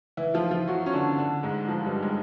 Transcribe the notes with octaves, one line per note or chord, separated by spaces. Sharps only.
E3 E4
F3 F4
F3 F4
F#3 F#4
C#4
D3 D4
D3 D4
G#2 G#3
F3
G2 G3
G3
G#3